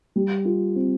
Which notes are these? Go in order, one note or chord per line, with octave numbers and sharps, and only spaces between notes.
G3
F4
C4